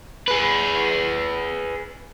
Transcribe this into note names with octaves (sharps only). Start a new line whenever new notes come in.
G#4 B4